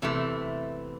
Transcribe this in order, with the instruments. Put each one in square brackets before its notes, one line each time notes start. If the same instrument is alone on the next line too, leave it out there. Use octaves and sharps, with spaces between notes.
[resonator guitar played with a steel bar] E2 C3 E3 A3